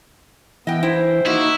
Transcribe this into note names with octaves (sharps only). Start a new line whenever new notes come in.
E3 B3 D#5 G5
E4 C5
A#3 D#4 E4 F#4